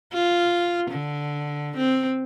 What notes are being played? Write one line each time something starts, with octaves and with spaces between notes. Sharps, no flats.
F4
D3
C4